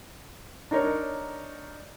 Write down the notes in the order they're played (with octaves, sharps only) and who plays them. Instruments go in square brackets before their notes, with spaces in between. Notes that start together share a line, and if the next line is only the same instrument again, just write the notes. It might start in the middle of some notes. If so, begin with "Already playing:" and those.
[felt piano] D4 D#4 A#4 C#5